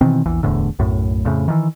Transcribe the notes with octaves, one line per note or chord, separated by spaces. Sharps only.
B2 D#3 E3 C4
A#1 E2 E3
D1 E2 A2 D3
B1 F#2 A2
F2 A2 C#3
D#3 E3